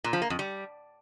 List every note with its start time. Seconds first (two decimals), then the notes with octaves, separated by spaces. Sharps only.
0.04 A#2
0.13 F3
0.22 A#3
0.30 F2
0.39 G3